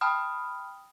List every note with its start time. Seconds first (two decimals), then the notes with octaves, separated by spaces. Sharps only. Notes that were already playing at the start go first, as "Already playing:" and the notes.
0.01 G5 A5 B5 D#6 F6